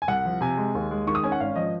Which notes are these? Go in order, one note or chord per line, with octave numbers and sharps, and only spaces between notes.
G#5
C2 F#5
F3
C3 G#5
G#3
D#2
G#3
D#3 C#6
D#6
C#4 G#5
F#5
G#1 F5
F3 D#5